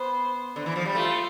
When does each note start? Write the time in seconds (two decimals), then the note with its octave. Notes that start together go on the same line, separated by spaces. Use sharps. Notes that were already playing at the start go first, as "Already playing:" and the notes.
Already playing: B3 C5
0.56 D3
0.66 E3
0.76 F3
0.85 G3
0.95 A3 F4